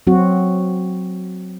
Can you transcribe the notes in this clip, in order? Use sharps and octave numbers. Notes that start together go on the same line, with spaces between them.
F#3 C4 F#4